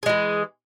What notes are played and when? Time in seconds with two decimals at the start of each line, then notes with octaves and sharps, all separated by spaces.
0.03 G#4
0.06 G#3
0.09 E3